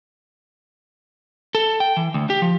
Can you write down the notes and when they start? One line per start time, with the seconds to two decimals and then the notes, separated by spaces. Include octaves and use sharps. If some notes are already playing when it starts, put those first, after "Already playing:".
1.55 A4
1.80 G5
1.97 E3
2.14 D2
2.30 G4
2.42 F3